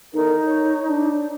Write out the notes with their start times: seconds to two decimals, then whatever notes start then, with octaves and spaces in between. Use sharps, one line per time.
0.14 E2 D#4 A4 A#4
0.47 C#5
0.87 D4